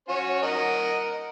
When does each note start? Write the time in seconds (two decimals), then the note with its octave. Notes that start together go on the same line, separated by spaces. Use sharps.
0.09 C#4 F#4 C#5
0.42 A#4 D#5 F#5